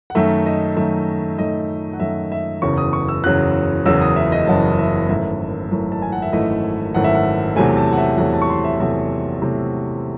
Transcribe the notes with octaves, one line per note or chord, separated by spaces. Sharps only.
F#5
F#2 D#3 A3 E5
D#5
F#2 D#3 A3 E5
F#2 D#3 A3 D#5
F#5
F#2 D#3 A3 E5
E5
F#1 E2 C#3 F#3 C#6
D#6
C#6
E6
F#1 E2 C#3 F#3 F#6
F#1 E2 C#3 F#3 E6
D#6
E5
D#5
F#1 E2 C#3 F#3 A5
E5
G#1 F#2 E3 A3 E5
G#1 F#2 E3 A3
A5
G#5
F#5
E5
G#1 F#2 E3 A3 D#5
G#1 F#2 E3 A3 F#5
E5
F#5
E2 C3 F#3 A3 G#5
A5
F#5
E5
E2 C3 F#3 A3 F#5
A5
C#6
C6
E5
E2 C3 F#3 A3 E5
E2 C3 F#3 A3